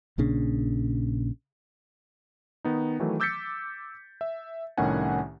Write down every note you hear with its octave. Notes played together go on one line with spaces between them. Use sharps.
A#1 A#2 C#3 D4
D#3 B3 D#4
D#3 E3 F#3 A3 A4
D6 E6 G6 A6 B6 C#7
E5
C2 A2 D#3 C#4 F#5 G#5